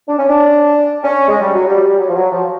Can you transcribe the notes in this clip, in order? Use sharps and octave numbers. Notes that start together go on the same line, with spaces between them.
D4
C#4
D4
C#4
G#3
G3
F#3
G3
F#3
F3
F#3
F3